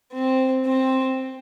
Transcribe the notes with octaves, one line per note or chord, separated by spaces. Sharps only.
C4
C4